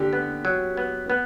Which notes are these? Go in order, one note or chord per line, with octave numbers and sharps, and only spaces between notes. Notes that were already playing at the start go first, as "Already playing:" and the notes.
Already playing: D3 G4
B3
F#3
B3
B3